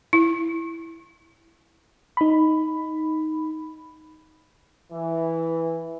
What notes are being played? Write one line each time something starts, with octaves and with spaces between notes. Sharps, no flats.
E4
D#4 B5
E3